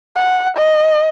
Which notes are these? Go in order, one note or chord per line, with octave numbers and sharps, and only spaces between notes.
F#5
D#5